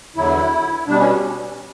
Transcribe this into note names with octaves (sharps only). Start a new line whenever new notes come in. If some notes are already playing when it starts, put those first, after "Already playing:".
E2 D3 F#3 E4
B2 G3 D4
C#4